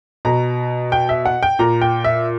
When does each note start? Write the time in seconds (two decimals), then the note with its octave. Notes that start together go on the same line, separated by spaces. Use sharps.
0.25 B2 A#5
0.92 G5
1.09 E5
1.25 F#5
1.43 G5
1.59 A#2 A#5
1.81 G5
2.04 E5